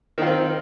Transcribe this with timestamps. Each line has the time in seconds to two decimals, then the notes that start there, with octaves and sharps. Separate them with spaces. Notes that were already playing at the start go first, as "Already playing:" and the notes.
0.18 D#3
0.22 F4
0.26 C4